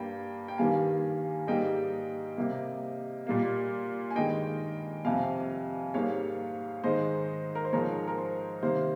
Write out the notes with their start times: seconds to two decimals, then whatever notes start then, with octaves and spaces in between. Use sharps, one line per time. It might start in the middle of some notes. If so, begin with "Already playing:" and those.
Already playing: G2 G3 A#3 G5
0.48 G5
0.58 G2 D#3 G3 A#3 F5 G#5
1.47 G#2 G3 A#3 D#5 G5
2.37 C3 G3 A#3
3.27 A#2 G3 A#3
4.11 G#5
4.16 G2 D#3 G#3 D#5 G5
5.05 F2 C3 G3 F5 G#5
5.94 G#2 G3 A#3 C#5 F5
6.84 G#2 D#3 G#3 C5 D#5
7.55 A#4
7.65 C5
7.73 G#2 F3 G#3 A#4 C#5
8.08 A#4
8.18 C5
8.62 C3 D#3 G3 A#3 C5